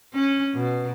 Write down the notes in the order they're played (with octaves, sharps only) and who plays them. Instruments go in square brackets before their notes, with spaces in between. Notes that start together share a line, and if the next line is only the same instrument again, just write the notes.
[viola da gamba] C#4
B2